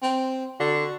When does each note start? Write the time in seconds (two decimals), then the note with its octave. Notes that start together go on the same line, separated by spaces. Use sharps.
0.02 C4
0.60 D3 F#4